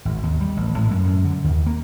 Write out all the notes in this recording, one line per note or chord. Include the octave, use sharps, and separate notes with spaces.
G#1
D#2
G3
A1
A2
F#2
F#2
D3
D#2
A#3